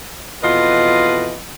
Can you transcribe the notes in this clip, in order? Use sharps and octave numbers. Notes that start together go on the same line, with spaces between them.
F2 B2 E3 F4 B4 D#5